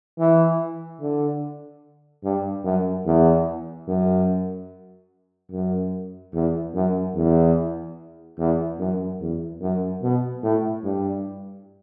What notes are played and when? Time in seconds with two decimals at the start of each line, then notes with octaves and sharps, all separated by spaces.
0.19 E3
1.01 D3
2.24 G2
2.65 F#2
3.06 E2
3.88 F#2
5.52 F#2
6.34 E2
6.74 F#2
7.16 E2
8.39 E2
8.79 F#2
9.21 E2
9.62 F#2
10.03 B2
10.43 A2
10.84 G2